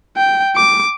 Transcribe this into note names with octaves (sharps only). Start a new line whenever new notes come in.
G5
D6